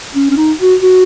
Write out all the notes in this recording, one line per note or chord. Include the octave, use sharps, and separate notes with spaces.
C#4
C#4
D#4
F#4
F#4